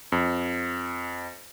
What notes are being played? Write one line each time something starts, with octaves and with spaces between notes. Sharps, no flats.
F2